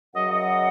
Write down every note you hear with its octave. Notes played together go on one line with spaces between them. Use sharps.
F#2 C#3 F#3 D#5 F#5
D#5 F#5